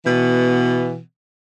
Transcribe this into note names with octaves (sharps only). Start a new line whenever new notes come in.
B2 E3 B3